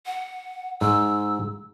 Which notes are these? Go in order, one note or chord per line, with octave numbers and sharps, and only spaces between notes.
F#5
G#2 E6